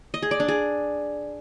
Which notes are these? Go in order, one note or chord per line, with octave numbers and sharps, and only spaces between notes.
D#5
G#4
D5
D4
G#4